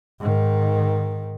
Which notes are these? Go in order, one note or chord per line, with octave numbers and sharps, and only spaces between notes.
G#2 D#3